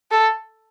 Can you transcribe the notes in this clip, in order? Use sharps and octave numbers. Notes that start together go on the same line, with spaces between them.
A4